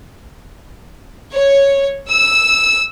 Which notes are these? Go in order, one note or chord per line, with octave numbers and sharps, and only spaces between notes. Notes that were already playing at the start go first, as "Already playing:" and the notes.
C#5
E6